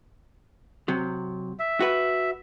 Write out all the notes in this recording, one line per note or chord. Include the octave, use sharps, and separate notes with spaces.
C3 F#3
E5
F#4 B4